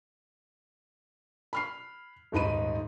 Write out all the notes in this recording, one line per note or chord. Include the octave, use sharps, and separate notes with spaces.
B5 F6 C7
D#1 G#2 D#4 B5 D#7